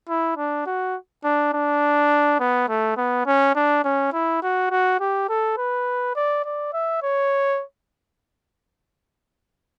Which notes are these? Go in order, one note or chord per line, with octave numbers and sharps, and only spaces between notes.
E4
D4
F#4
D4
D4
B3
A3
B3
C#4
D4
C#4
E4
F#4
F#4
G4
A4
B4
D5
D5
E5
C#5